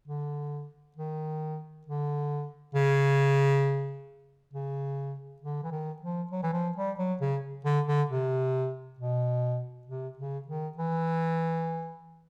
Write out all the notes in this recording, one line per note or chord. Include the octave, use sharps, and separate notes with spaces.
D3
D#3
D3
C#3
C#3
D3
E3
D#3
F3
F#3
E3
F3
G3
F#3
C#3
D3
D3
C3
B2
C3
C#3
D#3
E3